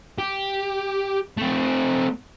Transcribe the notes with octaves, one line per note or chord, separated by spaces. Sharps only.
G4
A3 C4